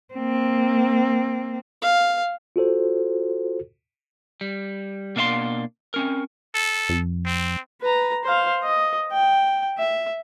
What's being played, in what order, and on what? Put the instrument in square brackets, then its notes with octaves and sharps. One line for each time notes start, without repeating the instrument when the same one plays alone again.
[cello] A#3 C4
[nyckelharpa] F5
[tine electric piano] F4 F#4 A4 C5
[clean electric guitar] G3
B2 A#3 D4 E5 F5 C6
C4 C#4 A#4
[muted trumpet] A4
[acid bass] F2
[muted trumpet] C4
[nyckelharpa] B4 A#5
C5 F5
D#5
G5
E5